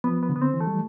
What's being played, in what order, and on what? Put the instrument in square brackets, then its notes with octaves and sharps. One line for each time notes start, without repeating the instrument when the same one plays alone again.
[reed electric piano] F3 [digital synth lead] B3
[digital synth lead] B3
[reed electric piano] D3
[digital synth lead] B3
C4
[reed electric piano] E3
[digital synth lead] A3
[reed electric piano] G3